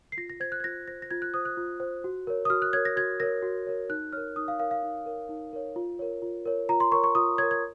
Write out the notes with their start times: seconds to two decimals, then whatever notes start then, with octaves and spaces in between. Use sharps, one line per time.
0.12 C7
0.17 F4 A#6
0.30 A#6
0.40 C5 G#6
0.52 F#6
0.60 G#6
0.64 F4 A#6
0.88 C5 A#6
1.02 A#6
1.11 F4 G#6
1.22 F#6
1.34 C5 D#6
1.45 F#6
1.57 F4
1.80 C5
2.04 F#4
2.27 A#4 C#5
2.45 D#6
2.50 F#4 F6
2.62 F#6
2.73 A#4 C#5 G#6
2.85 A#6
2.96 F#4 G#6
3.20 A#4 C#5 A#6
3.43 F#4
3.66 A#4 C#5
3.89 D#4 F#6
4.13 A#4 C#5 F6
4.36 D#4 D#6
4.48 F5
4.59 A#4 C#5 F5
4.71 F5
4.83 D#4
5.06 A#4 C#5
5.29 D#4
5.53 A#4 C#5
5.76 F4
5.99 A#4 C#5
6.22 F4
6.45 A#4 C#5
6.69 F4 A#5
6.80 C6
6.92 A#4 C#5 C#6
7.04 C#6
7.15 F4 D#6
7.38 A#4 C#5 G#6
7.51 G#6